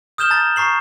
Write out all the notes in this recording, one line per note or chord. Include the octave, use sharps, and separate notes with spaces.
D#6 F6 G6 E7 G7
A5 A#5 A6
A#5 C#6 C7 F#7